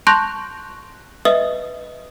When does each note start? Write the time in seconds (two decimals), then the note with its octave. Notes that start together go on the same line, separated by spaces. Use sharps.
0.07 A5 C6 C#6 F#6 G6 A#6
1.25 B4 D#5 E5 D#6